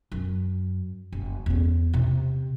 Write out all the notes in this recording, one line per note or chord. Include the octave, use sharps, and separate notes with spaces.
F#2
F#1
E2 C#4
C3